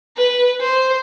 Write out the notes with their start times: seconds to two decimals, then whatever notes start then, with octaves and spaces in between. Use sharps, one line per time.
0.17 B4
0.61 C5